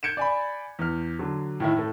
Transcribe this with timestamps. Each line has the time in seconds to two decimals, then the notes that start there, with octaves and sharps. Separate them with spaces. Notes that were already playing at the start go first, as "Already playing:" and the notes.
0.03 G6 G#6 C#7 D7 E7
0.17 D5 G#5 B5
0.79 E2 F6
1.19 D3 F#3
1.60 A2 D#3 E4
1.76 A2 A3